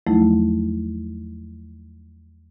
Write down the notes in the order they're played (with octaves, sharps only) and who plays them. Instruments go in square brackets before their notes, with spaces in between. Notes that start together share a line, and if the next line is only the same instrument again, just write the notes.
[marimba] E2 F3 F#3 A3 D#4 E4